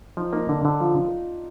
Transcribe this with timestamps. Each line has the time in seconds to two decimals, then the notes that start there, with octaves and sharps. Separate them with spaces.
0.17 F3 D#4
0.33 A#3 D#4
0.49 D3 D4
0.65 D3
0.80 F3 F4